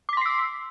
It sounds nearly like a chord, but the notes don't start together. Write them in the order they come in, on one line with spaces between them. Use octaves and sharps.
D6 B6 C6 C7 E6